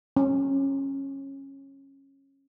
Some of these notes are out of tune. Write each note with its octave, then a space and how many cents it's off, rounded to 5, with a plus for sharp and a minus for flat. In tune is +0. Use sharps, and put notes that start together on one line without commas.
C#4 -20